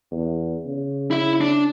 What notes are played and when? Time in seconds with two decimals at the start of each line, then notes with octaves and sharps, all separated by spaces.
0.11 E2
0.66 C#3
1.11 E4 E5
1.41 D4